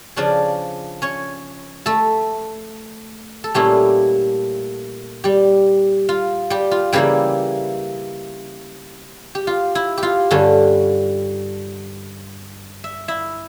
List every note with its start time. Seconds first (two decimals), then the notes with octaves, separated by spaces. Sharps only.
0.16 C#3 F3 C#4 D4 D5
1.02 C#4 C#5
1.86 A3 A4
3.44 A4
3.54 A#2 G3 A3 C#4 E4 G4
5.24 G3 G4
6.09 F4
6.50 G3 G4
6.71 F4
6.93 C#3 E3 G3 A#3 E4 G4
9.35 G4
9.47 F4
9.75 E4
9.98 G4
10.03 F4
10.31 G2 D3 G3 C#4
12.84 E5
13.08 E4 E5